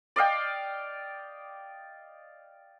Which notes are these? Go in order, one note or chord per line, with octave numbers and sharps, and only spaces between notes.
D5 D#5 F5 G5